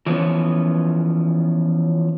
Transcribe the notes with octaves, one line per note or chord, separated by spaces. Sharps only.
E3 F3 B3 C#4